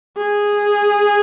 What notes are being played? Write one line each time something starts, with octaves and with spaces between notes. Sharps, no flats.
G#4